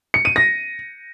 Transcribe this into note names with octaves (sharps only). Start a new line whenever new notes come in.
C#7
D#7
A#6